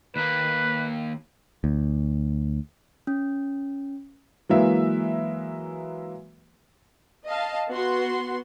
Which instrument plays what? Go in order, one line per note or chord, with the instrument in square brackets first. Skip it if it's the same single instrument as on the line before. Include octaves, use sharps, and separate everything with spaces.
[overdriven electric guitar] D#2 A#3 [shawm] B4
[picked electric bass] D2
[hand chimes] C#4
[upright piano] E3 F#3 G#3 A#3 B4 E5
[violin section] D#5 F5 A5
B3 F#4 C6